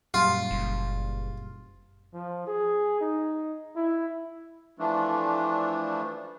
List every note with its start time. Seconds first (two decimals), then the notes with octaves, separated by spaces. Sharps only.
0.14 F#2 A#2 G3 F4
0.51 F#1
2.14 F3
2.47 G#4
3.01 D#4
3.76 E4
4.79 E3 F3 A3 D4